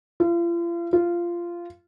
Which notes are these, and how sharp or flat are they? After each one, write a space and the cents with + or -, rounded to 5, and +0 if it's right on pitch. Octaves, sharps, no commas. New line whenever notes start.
F4 -40
F4 -15